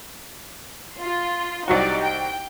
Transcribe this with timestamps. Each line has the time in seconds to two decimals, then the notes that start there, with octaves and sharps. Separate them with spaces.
0.96 F4 C6
1.68 C2 F#3 D#4 F#4 G4 D5
2.03 G5